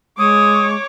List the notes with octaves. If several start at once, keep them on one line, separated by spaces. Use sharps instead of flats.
G#3 C#5 D6 D#6